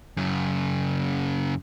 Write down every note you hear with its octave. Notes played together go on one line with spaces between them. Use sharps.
F#2 C#3